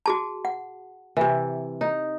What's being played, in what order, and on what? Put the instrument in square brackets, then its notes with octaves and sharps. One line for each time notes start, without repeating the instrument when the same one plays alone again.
[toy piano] F#4 G#4 A5
F#5
[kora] C3 E3
D#4